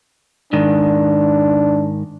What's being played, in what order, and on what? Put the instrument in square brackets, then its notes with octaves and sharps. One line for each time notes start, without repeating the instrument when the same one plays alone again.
[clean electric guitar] G#2 D#3 [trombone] D4